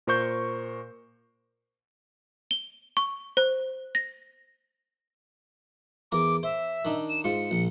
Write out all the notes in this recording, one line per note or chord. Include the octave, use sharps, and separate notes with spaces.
A#2 A#4 C5 C#6 G6
G7
C#6
C5
A#6
E2 A#4 A#5 D6
C5 E5
D#3 D4 D#4
E7
G#2 F4 C#7
A#1